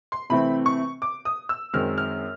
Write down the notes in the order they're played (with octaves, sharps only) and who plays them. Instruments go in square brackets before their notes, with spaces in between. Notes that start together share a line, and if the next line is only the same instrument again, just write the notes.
[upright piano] C6
C3 E3 A3 C4 B5
C#6
D6
D#6
E6
F#2 D#3 G#3 C4 F6
F6